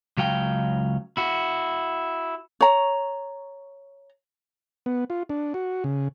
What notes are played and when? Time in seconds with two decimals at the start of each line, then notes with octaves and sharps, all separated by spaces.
0.17 C#2 F#3 F5 G5
1.17 E4 F#4
2.61 C#5 A#5
4.86 B3
5.10 F4
5.30 D4
5.54 F#4
5.84 C#3